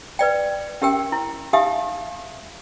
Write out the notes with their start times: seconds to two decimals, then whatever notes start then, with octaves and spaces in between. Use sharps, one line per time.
0.19 B4 D5 G5
0.82 C#4 G4 A#4 G5
1.12 E4
1.53 D#4 G4 E5 F5 G#5 D#6